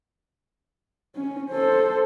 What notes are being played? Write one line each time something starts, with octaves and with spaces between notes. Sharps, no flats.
C#4
A4 C5